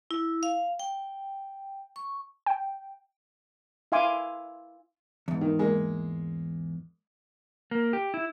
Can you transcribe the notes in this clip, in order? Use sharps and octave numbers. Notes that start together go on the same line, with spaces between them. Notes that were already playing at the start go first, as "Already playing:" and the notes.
E4
F5
G5
C#6
G5
E4 E5 F5 G#5 C6 D6
E2 G#2
D#3
G#3 A#3
A#3
G4
E4